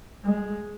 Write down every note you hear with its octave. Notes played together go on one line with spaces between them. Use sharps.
G#3